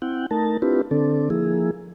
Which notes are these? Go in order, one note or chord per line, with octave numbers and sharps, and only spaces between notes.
C4 E4 F#5 G5
A3 D#4 A#4 A5
C4 D4 E4 F4 G4 B4
D3 C4 D4 A4
F3 A#3 E4 G#4